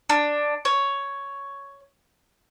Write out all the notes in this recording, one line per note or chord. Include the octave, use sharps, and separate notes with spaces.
D4
C#5